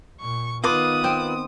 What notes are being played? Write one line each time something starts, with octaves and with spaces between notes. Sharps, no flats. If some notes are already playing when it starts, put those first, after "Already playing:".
A#2 C#6
D#3 B3 F4 B4 D6 D#6
C4